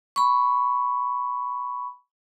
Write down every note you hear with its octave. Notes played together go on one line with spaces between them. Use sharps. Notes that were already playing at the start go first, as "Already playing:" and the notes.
B5 C#6